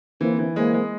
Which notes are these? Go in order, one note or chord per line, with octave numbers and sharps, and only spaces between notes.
E3 A#3 C4
E3
G#3 A#3 C4
G#3